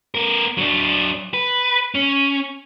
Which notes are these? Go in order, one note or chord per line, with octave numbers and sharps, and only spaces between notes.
B3 A#4
F#3 D4
B4
C#4